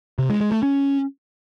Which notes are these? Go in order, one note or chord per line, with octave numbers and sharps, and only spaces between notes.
C3
G#3
G#3
A3
C#4